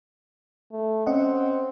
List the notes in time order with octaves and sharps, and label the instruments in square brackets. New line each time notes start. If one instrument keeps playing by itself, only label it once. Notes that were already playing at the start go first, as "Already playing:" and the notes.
[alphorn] A3
[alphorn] C4 [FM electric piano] C#4 D#5 F#5